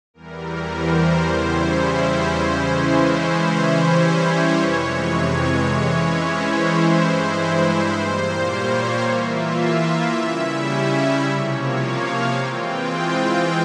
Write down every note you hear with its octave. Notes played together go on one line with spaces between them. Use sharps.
E2 E3 G3 A#4
C5
E2 C#3 G3 C#4 E4
C#3 E3 G#3 C#4 E4
C5
E3 G3 C#4 E4 C5
C#5
F2 C3 E3 G#3
E3 G#3 C#4 E4
C5
G2 E3 G#3 E4
A#2 G3 A#3 C5
C#5
E3 A#3 F4 E5
C#3 G3 C#4 E4 E5
C3 F3 A#3 C#5
F5
E3 G#3 C4 F4 G5